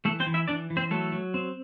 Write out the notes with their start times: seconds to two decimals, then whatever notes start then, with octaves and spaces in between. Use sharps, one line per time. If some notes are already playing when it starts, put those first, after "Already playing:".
0.05 E3 A3 A4
0.20 C4 C5
0.26 E3
0.34 E4 E5
0.48 E3 D4 D5
0.70 E3
0.77 C4 C5
0.91 F#3 A3 A4
1.12 F#3
1.34 C4